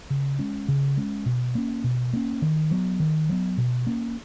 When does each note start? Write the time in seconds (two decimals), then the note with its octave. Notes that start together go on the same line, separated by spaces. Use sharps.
0.10 C#3
0.39 G#3 C#4
0.68 C#3
0.97 G#3 C#4
1.26 B2
1.55 A#3 C#4
1.84 B2
2.13 A#3 C#4
2.42 D#3
2.71 F#3 B3
3.00 D#3
3.29 F#3 B3
3.58 B2
3.87 A#3 C#4